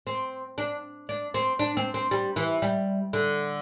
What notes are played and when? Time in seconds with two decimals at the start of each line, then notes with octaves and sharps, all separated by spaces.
0.07 C4
0.58 D4
1.09 D4
1.34 C4
1.59 D4
1.77 C4
1.94 C4
2.11 G3
2.36 E3
2.62 G3
3.13 D3